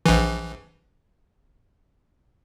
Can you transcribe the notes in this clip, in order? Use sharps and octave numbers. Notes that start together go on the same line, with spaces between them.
A#1 E3